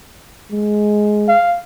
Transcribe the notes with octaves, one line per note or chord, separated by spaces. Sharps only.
G#3
F5